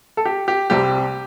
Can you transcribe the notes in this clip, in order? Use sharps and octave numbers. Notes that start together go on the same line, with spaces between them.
A4
G4
G4
C2 C3 G3 C4 G4